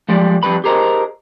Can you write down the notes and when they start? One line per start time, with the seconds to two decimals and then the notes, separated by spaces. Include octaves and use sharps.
0.09 F3 G3 G#3 D5
0.43 F2 G3 B4 B5
0.64 G4 G#4 A#4 C5 D#5